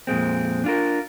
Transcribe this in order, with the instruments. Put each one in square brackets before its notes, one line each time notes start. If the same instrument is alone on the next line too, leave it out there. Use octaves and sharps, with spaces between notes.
[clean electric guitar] F2 A#2 G#3 C4
D4 F4 A#4